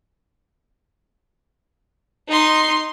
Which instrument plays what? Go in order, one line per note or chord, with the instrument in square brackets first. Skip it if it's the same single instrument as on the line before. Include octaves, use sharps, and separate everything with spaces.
[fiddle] D#4 C6